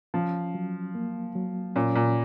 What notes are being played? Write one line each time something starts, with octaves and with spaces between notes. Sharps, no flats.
F3 C#4
F#3
A#3
F#3
A#2 C#4
A#2